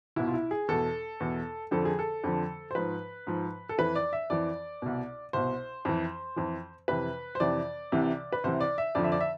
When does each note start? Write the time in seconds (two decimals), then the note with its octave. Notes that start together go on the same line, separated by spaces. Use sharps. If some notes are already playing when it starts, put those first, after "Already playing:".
0.16 C2 B2 E4
0.27 F4
0.34 E4
0.51 G#4
0.68 E2 B2 A4
1.20 E2 B2
1.71 F2 D3 F3 A4
1.85 G#4
1.99 A4
2.24 F2 D3 F3
2.71 C5
2.75 G#2 F3 B4
3.27 G#2 F3
3.69 A4
3.78 F2 E3 B4
3.95 D5
4.13 E5
4.30 F2 E3 D5
4.82 C2 B2
5.33 C2 B2 C5
5.85 F2 E3
6.36 F2 E3
6.88 F2 C3 E3 B4
7.35 C5
7.40 F2 C3 E3 D5
7.92 C2 C3 E3
8.33 B4
8.44 C2 C3 E3 C5
8.60 D5
8.78 E5
8.95 F2 D3 F3 D5
9.04 E5
9.12 D5
9.21 E5